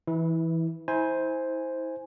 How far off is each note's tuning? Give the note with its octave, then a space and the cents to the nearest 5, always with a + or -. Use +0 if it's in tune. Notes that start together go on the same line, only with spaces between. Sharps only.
E3 +0 E4 -25
E4 -35 C5 +0 G#5 +0